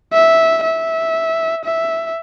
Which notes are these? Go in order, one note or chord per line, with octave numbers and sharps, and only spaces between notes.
E5
E5
E5